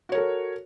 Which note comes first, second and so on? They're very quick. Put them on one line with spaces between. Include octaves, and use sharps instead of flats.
F#4 C#5 A#4 A4